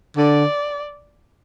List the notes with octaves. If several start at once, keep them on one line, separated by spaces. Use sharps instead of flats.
D3 D5